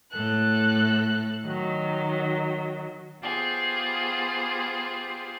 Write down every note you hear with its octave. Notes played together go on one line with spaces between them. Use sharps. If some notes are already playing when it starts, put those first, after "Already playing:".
A2 A4 F#6
D#3 F#3
B3 F4 G4 G#4 C5